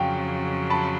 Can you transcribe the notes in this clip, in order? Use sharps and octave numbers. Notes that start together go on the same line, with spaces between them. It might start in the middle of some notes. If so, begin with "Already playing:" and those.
Already playing: F2 C#3 F#3 F5 G5
A5 B5